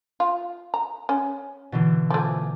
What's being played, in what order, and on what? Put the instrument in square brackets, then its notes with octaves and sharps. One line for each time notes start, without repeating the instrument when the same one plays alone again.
[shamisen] F4
A#5
C#4
[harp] B2 D3 E3
[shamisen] F3 A3 [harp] G#5 D6